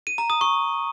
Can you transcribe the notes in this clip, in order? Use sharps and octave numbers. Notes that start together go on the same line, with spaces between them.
D#7
A#5
D#6
C#6